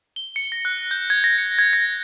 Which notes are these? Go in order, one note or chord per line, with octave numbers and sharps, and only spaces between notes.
G7
C#7
A#6
F#6
G6
G#6
A#6
C#7
G#6
A#6